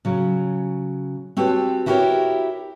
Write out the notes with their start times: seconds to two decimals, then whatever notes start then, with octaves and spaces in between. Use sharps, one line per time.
0.05 C#3 F#3
1.37 C4 F#4 G4 A4 B4 C#5
1.86 E4 F#4 G4 A#4 B4 C#5